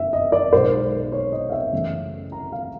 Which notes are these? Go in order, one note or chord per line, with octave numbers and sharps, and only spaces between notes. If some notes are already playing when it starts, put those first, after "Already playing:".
Already playing: F#1 F#2 D#3 E5
D#5
D5
B1 B2 G#3 C5
C#5
D#5
F5
E5
F#2 C#3 E3 A3
A#5
F5